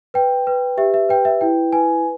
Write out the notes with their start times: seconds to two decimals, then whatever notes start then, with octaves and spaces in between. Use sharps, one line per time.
0.14 B4 G5
0.47 B4
0.77 G4 E5
0.94 E5
1.09 B4 G5
1.25 E5
1.41 E4 G5
1.73 B4 G#5